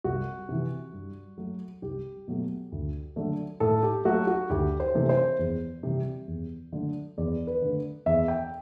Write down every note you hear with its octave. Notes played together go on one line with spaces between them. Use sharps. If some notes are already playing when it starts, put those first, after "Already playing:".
C2 F#4
C3 E3
G2
F#3 A3
C2 G4
B2 F#3 A3
D2
D3 F#3 A3
A2 A4
G4
F#3 A3 F#4
F#4
D2 G4
C5
C3 E3 A3
C5
E2
C3 E3 G3
E2
D3 F#3 A3
E2 D5
B4
D3 A3
E2 E5
G5